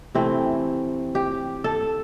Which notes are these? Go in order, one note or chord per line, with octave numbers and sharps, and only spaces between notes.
C3 E3 A3 C4
G4
A4